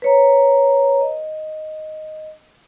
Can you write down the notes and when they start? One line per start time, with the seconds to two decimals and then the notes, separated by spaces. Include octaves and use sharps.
0.02 B4 C#5 A#5
1.01 D#5